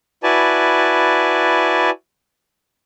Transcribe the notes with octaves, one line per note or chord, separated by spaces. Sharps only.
E4 F#4 B4 D5 G#5 A5